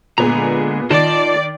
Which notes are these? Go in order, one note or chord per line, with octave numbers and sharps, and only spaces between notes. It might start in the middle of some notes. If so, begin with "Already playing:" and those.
A#2 D3 G#3 B3 G#4 A#5
D#3 F4 D5 D#5 A5